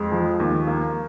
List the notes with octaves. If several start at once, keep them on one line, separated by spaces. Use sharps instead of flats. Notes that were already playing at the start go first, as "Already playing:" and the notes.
Already playing: F2 G#3
F3
D#2
A#3